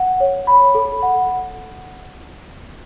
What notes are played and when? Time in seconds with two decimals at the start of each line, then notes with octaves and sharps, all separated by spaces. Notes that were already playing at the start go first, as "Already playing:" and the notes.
Already playing: F#5
0.20 C#5
0.47 B5
0.75 A4
1.02 F#5